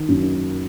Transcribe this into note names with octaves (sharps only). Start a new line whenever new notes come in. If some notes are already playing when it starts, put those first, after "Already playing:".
Already playing: D#3
F#2